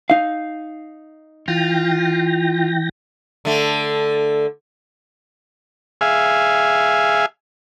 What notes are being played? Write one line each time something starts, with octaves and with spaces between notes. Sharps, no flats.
D#4 F5
E3 F4 G5 A#6
D3 A3
G#4 E5 F5 G#5